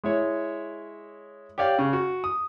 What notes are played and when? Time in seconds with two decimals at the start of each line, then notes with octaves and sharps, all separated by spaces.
0.04 G#3 E4 C#5
1.58 G4 C#5 D5 F5 G5
1.79 C#3
1.93 F#4
2.24 D#6